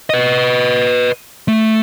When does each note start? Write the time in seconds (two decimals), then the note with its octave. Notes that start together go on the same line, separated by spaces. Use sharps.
0.10 B4 D#5
1.48 A3